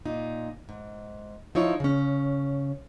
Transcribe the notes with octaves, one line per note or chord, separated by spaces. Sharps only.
A#2 D#4
G#2
F3 D#4 E4 C#5
C#3 C#4